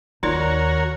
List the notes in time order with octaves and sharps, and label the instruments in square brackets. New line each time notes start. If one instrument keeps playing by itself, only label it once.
[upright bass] D#2 [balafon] D#4 F4 D5 [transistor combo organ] F#4 A#4 C#5